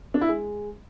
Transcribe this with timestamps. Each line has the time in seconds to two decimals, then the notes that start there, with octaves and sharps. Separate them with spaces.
0.14 D4
0.21 E4
0.28 G#3